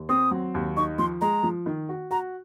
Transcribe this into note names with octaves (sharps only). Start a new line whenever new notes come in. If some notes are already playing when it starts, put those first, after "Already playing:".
Already playing: D#2
C4 D#6
F#3
D#2
D#4 C#6
F3 C6
G#3 A#5
F3
D#3
F#4
F#4 A#5